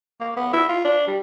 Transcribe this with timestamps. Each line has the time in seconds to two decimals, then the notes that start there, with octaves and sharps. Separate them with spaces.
0.21 A#3
0.37 B3
0.53 E4
0.69 F4
0.85 D4
1.07 G3